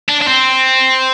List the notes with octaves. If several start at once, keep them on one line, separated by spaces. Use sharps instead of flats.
D4
D4
C4